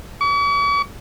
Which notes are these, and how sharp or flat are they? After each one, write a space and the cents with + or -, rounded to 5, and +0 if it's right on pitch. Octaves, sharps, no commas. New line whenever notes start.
C#6 +45